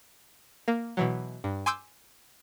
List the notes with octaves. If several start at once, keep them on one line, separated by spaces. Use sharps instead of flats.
A#3
B2 E3 F#3
G2
G#5 C6 D6 E6 G6